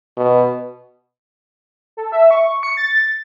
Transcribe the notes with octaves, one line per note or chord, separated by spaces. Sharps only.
B2
A4
E5
C#6
C#7
A6